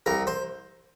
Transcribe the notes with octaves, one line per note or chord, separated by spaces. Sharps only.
C2 A#4
C5